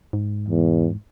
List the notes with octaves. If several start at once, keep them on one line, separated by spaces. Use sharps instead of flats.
G#2
E2